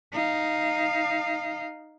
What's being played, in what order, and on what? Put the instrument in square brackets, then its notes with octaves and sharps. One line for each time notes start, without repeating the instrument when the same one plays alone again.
[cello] D#4 F5